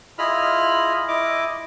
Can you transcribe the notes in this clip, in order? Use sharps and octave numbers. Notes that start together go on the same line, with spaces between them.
E4 F4 G#4 D#5 B5 F6
E4 D#5 D6